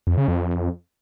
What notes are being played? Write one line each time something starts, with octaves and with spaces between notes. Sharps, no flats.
F2
C#3
F2